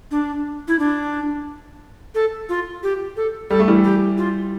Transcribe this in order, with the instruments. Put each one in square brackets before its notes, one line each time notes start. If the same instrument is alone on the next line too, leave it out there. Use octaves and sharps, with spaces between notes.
[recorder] D4
E4
D4
A4
F4
G4
A4
[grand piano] G3 [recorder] A4
[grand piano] A3
E3 G3
[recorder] G4
F4